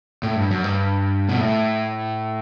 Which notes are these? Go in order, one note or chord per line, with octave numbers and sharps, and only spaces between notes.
A2
G2
F#2
G2
B2
A2